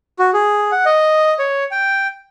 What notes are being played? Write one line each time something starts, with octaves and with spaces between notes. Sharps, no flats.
F#4
G#4
F#5
D#5
C#5
G5